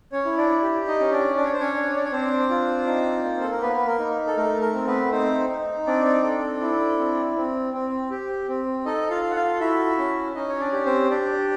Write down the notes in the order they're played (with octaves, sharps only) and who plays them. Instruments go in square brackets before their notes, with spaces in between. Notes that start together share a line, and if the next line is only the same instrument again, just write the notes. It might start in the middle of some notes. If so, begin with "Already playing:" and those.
[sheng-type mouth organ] C#4 C#5
E4
D4 D5
G4
D#4 D#5
C#4
D4 D5
D4 D5
C#5
C5
C#4 C#5
D4
D5
C#5
C4 D4 C5
F4
D#4
A#3
A4
A#4
A#3 B3 B4
B4
A#4
D#4
A4
A3 A#4
A#4
C4
B3 B4
C4 D#4 C5
D#4
C4 D4 D5
A4
E4
C4
C4
C4
G4
C4
D#4 A4 D#5
F4 F5
A4
F#5
F4 F5
E4 F#4 E5
C#4
C#4 D#4 D#5
C#5
D4 D5
G4
C4 C5
D4 G4 D5